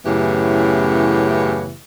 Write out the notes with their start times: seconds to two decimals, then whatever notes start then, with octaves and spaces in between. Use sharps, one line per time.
0.05 F#2 A2 C#3 E3 B3 G4